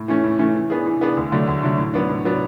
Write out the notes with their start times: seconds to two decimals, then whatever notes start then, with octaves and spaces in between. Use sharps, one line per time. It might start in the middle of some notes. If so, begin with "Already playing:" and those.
Already playing: A2
0.08 E3 A3 C#4
0.24 A2
0.39 E3 A3 C#4
0.55 E3
0.70 B3 D4 G#4
0.86 E3
1.01 B3 D4 G#4
1.17 D2
1.32 D3 F#3 A3 D4
1.47 D2
1.63 D3 F#3 A3 D4
1.78 A2
1.94 F#3 B3 D4
2.09 A2
2.25 F#3 B3 D4